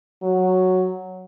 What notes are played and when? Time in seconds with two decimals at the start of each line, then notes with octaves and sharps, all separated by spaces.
0.23 F#3